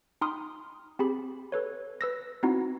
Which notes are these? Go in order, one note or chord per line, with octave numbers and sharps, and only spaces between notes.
D#4 G5 B5 C6 D#6 F6
C4 G4 G#4 B5
A4 B4 C#5
B4 E6 A#6
B3 C4 D#4 E4 F#4